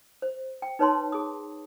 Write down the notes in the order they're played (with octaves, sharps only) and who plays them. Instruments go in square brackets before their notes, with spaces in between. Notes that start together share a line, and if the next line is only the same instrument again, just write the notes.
[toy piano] C5
G5
D#4 B4 C#5 A5 C6
G#4 D#6